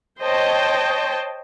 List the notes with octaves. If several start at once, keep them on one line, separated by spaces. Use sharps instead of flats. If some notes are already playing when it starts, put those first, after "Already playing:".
C5 C#5 D#5 G5 A5